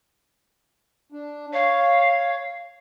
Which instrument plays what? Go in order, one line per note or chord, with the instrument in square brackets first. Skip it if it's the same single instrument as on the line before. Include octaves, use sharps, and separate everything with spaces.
[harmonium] D4
[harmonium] C#5 [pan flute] F5